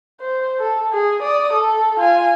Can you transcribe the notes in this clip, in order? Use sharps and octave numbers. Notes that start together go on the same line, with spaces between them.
C5
A4
G#4
D5 D#6
A4
F4 G#5